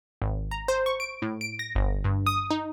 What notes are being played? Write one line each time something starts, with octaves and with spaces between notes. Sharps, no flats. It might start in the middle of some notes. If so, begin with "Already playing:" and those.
G#1
A#5
C5
C#6
D7
A2
D7
A#6
G1
G2
D#6
D#4